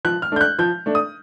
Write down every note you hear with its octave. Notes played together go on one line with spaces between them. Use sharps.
F3 F#6
F6
A3 D4 G6
F#6
F3 G6
A3 D4
D#6